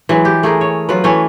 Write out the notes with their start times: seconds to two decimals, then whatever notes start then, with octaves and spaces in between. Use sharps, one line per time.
0.09 E3 F#3 G#3
0.25 G4
0.43 A3 G#4 A#4
0.61 C#5
0.89 F#3 F4 B4
1.04 E3 A3 C#4